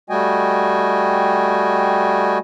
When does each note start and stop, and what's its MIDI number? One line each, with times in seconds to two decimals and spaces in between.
0.10 2.38 55
0.10 2.38 57
0.10 2.38 66
0.10 2.38 75
0.10 2.38 79
0.10 2.38 80